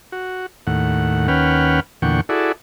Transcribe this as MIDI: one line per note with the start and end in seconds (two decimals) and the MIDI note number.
0.12 0.46 66
0.67 1.28 39
0.67 1.28 45
0.67 1.28 78
1.28 1.80 39
1.28 1.80 61
1.28 1.80 71
1.28 1.80 78
1.28 1.80 79
1.28 1.80 89
2.02 2.21 40
2.02 2.21 46
2.02 2.21 50
2.02 2.21 78
2.02 2.21 79
2.02 2.21 85
2.29 2.52 64
2.29 2.52 66
2.29 2.52 68
2.29 2.52 69
2.29 2.52 74